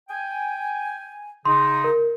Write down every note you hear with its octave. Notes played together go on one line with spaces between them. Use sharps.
G5 G#5
C#3 D#4 C6
A#4